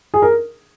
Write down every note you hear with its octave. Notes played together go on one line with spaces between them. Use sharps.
G#4
A#4